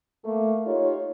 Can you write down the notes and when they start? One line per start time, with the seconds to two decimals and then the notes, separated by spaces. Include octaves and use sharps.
0.25 A3 A#3
0.66 D#4 F4 G4 C#5